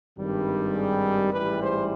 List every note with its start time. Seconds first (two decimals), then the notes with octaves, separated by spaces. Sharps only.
0.17 G#1 G2 D#3 G3
0.74 G#4
1.32 A1 G#2 E3 G3 B4
1.61 C5